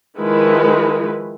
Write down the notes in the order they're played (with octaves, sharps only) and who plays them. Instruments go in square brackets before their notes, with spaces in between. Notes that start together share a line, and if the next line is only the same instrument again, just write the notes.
[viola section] D#3 F3 G#3 E4 B4